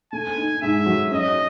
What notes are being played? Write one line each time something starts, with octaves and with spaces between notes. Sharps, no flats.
A3 G#5
D#4
G#2 E5
F#3
C#4 D#5